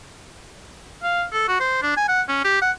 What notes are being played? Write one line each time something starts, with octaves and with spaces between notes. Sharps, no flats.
F5
A4
F#4
C5
D4
G#5
F#5
C#4
G4
F#5